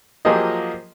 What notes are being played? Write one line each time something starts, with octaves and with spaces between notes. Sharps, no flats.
F3 F#3 A#3 G4 G#4 D#5